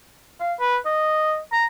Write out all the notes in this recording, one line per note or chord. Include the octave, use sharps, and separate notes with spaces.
F5
B4
D#5
A#5